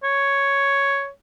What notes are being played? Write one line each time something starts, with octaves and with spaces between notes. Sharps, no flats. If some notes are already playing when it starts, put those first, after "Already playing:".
C#5